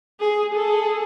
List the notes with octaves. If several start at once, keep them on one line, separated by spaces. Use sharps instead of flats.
G#4
G#4 A4